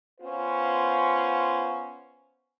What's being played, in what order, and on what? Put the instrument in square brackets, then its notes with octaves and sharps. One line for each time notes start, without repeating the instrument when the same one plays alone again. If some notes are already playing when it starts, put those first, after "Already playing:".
[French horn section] B3 C#4 F4 C5